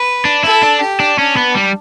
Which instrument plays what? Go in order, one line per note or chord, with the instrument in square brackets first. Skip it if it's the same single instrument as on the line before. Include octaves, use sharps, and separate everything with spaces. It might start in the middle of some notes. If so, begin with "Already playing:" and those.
Already playing: [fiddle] B4
[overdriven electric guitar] D4
[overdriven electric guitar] E4 [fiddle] A4
[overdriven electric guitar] D4
[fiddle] G4
[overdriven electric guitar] D4
[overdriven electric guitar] C#4 [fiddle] D4
[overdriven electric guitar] B3
G3